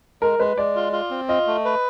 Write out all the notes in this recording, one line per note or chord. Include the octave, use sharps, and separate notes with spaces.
G#3 A#4
G#3 B4
G#3 D5
F4
F4
C4
F4 D#5
A3
B4